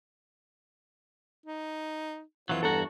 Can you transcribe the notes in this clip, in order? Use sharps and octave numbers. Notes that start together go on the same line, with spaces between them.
D#4
F2 E3 F#3 F4
E2 G2 F#4 A4 A#5